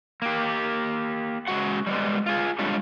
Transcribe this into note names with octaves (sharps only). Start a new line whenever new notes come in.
A#3 G4
C#3 G#3 F#4 F#5
G3 G#3 B3
F4 G#4
D3 G3 G#3 D4 F4 C#5